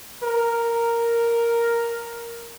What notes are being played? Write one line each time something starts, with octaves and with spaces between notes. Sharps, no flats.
A#4